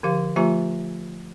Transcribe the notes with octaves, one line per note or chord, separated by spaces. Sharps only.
D3 F3 G4 F5
F3 A3 F4 G4 G#5 A#5